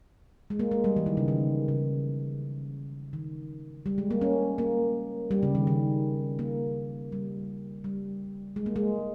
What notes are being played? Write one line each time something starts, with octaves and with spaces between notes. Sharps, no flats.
G#3
A#3
G#3
G3
E3
D#3
C#3
D#3
C#3
D#3
G3
G#3
A#3
C#4
A#3
G3
C#3
D#3
D#3
A#3
G3
G3
G#3
A#3
G#3